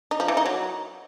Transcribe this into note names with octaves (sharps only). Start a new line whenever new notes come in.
D#4
F3
E3
D#4
F#3